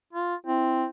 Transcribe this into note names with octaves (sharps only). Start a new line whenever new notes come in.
F4
C4 E4